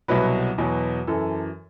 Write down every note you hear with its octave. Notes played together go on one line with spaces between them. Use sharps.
C2 B2 F#3 B4
E2 B2 F#3
F#2 E3 A4